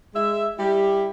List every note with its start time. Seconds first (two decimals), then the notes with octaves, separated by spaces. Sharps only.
0.15 G#3 E5
0.59 G3 E4 G4